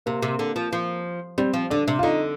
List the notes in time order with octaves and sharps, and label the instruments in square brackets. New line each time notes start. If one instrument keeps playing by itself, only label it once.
[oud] C3 [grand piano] A#3
[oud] C3
D3
F3
F3
[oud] G3 [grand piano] C4
[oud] F3
[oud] D3 [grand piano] D4
[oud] C3
[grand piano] F4
[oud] D3 [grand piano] D#4